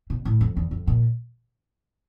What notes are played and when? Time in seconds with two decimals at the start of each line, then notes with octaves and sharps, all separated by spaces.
0.10 B2
0.25 A2
0.41 F2
0.57 E2
0.71 F2
0.87 A#2